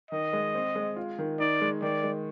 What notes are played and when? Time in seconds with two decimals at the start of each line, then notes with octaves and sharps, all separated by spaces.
0.11 D#3 D#5
0.33 G#3
0.55 C4
0.75 G#3
0.96 F4
1.18 D#3
1.40 D#4 D5
1.61 G#3
1.82 D#3 D5
2.03 G#3